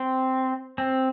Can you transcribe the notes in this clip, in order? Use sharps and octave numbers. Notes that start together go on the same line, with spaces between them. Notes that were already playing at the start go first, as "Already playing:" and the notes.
Already playing: C4
C4